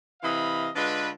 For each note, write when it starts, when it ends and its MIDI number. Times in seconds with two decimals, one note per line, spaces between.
0.22 0.68 48
0.22 0.68 52
0.22 0.68 75
0.22 0.68 77
0.22 0.68 83
0.76 1.09 50
0.76 1.09 56
0.76 1.09 65
0.76 1.09 71